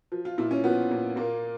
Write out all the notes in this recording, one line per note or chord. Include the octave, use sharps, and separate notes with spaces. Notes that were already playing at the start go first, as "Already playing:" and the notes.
F3
F4
A#2 E4
C#4
F3 B3
A#2
A#2 A#3